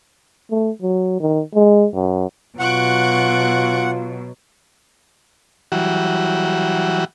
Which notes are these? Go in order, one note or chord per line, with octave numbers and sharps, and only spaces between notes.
A3
F#3
D#3
G#3
F#2
B2 F#3 F4 F#5 C#6 F#6 D7
E3 F#3 G3 F#4